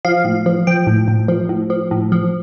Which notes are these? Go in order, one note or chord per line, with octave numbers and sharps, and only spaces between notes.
F3 F5
A2
F3
F3 G5
A2
A2
F3
A2
F3
A2
F3